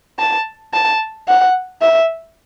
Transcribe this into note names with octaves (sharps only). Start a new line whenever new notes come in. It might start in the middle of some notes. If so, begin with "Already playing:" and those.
A5
A5
F#5
E5